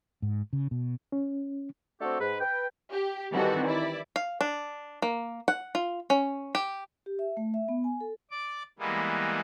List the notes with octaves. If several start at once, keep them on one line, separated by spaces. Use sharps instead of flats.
G#2
C#3
B2
C#4
A3 C4 D4 F#4 G4 A4
G#2 B4
B4 G5
G4
D#3 E3 G3 C4 F#4 A4
E4 D5
F5
D4
A#3
F#5
F4
C#4
G4
G4
E5
A3
E5
B3
G#5
A4
D5 D6
E3 G3 G#3 A#3 B3